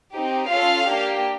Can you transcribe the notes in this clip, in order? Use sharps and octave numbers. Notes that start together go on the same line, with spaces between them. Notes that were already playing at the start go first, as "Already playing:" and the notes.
C4 D#4 G4
C#4 F4 A4 F5
A#3 D4 G4